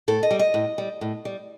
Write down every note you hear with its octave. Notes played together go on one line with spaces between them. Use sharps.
A2 A4
D#5
G3
D#5
A2
G3
A2
G3